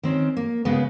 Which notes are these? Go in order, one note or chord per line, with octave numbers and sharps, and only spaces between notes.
D#3 C4 C#4
A#3
C#3 G#3 B3